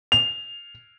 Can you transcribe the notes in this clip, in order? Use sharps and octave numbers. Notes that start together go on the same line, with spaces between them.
F7